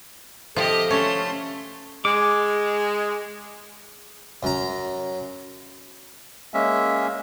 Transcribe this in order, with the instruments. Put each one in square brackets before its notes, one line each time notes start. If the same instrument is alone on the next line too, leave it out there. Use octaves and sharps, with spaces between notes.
[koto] C3 F3 F4 [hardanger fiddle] G4 D#5 [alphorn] A4
[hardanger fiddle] A3 C6 [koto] C#4
[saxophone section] G#3 [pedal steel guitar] D6
[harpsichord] F#2 A#5
[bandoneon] G#3 A#3 C#4 E5